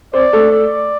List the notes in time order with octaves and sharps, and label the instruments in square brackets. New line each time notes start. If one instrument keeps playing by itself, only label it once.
[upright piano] C4 C5 [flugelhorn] D5
[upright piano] A3 A4
[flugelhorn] D5